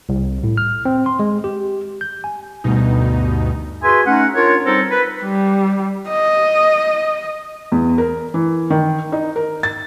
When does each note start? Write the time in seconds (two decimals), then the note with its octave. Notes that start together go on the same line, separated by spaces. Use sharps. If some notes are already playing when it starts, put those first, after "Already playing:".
0.09 C2
0.44 A2
0.57 F6
0.85 C4
1.06 C6
1.19 G#3
1.44 G4
2.01 G6
2.24 G#5
2.64 D2 G2 B2 D#4
3.83 F#4 G#4 B4 E5 G#5 C6
4.06 A3 C#4 D#4 F#5
4.35 D4 F4 A#4 C#5
4.65 G3 C4 D#4 A4 A#4 C5
4.91 B4
5.22 G3
6.09 D#5
7.72 E2
7.98 A#4
8.34 E3
8.70 D#3
9.12 D#4
9.36 A#4
9.63 A6